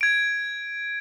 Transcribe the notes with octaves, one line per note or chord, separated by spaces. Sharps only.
G#6 D7